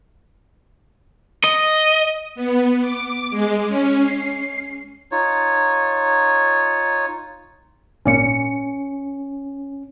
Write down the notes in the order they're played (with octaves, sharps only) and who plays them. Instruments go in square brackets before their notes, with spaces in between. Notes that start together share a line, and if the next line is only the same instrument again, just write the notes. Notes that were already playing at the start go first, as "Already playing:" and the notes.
[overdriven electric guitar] D#5
[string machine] B3
D6
G#3
C#4
C7
[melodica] D#4 F4 C#5
[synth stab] G#1 A#2 C#7 [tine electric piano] C#4